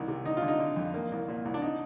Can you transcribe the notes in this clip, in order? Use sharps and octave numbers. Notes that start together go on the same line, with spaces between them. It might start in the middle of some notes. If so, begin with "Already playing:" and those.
Already playing: C2 D#3
C3
D3 D#4
F4
D3
D#4
D3
F2
A#3
C2
A#2
C2
D4
D#4